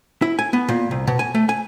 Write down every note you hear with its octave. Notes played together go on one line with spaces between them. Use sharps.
E4
G#5
B3
A#2
C2
B2
G#5
A3
G#5